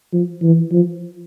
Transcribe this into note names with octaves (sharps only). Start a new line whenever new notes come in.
F3
E3
F3